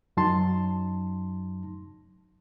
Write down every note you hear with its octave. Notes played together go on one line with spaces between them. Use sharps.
F#2 F#3 D#4 A5 C6